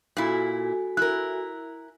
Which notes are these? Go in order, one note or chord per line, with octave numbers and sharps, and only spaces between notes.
A#2 E4 F#4 A4 G#5
E4 A#4 F#6